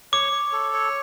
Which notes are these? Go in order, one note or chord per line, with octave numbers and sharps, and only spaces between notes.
C#5 D6
C#5
A4
C#5